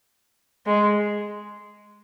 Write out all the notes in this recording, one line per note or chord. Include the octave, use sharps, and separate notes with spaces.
G#3